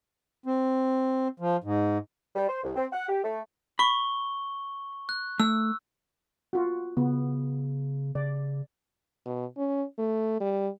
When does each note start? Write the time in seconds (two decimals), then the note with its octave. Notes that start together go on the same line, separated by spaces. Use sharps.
0.46 C4
1.40 F3
1.64 G#2
2.36 G3
2.49 C5
2.64 C2
2.76 C4
2.93 F#5
3.09 G4
3.24 A3
3.79 B5 C#6 G7
5.09 F#6
5.40 A3 E6
6.53 F4 F#4
6.97 C#3 B3
8.15 C#3 D5
9.25 B2
9.57 C#4
9.99 A3
10.40 G3